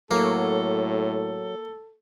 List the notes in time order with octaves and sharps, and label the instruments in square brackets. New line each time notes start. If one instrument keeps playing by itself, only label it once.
[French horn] A2 [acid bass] F#3 [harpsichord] A#3 [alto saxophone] A4